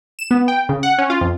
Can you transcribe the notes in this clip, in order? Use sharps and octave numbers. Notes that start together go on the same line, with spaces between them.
E7
B3
G5
C#3
F#5
C#4
F4
F2